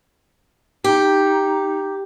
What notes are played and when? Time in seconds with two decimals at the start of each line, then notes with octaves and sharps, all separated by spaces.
0.84 D#4 G4